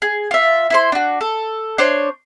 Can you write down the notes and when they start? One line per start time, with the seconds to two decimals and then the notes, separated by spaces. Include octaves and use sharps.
0.02 G#4
0.31 F4 E5
0.70 E4 C5 C6
0.92 D4 F#4
1.21 A4
1.78 D4 C5 C#5